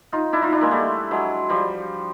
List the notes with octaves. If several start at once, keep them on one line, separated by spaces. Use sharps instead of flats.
D#4 F4
D4 E4
D#4 F4
D4 E4
G#3 A#3
G3 A3
F#3 G#3
F3 G3